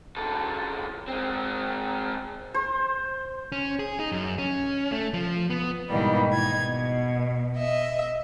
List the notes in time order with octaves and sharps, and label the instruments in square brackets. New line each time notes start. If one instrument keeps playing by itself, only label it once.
[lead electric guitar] C#2 A4
G#3 C4
[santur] C5
[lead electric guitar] C#4
G#4
D#4
F#2
C#4
A3
F3
B3
[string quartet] G#2 B2 D#3 E3 G3 A#3
D#4 G#6
B2
D#5 E5